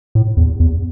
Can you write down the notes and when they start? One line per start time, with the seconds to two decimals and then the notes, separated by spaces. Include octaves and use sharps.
0.15 A2
0.37 E2
0.60 E2